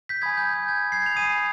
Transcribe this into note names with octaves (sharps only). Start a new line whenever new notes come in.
G6 B6
G#5 B5 D#6 G#6
G6
G6
G#6
G#6 C7
F7
G#5 B5 D#6 C7 D#7